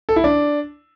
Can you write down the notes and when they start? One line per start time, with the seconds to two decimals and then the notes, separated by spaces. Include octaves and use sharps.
0.09 A4
0.16 E4
0.24 D4